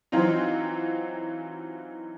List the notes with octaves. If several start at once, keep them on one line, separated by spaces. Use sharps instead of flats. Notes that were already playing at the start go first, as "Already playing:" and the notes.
E3 F#3 C4 D#4 F4